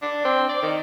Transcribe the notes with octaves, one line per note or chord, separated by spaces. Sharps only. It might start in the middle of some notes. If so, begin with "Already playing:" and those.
D4
C4
D5
D#3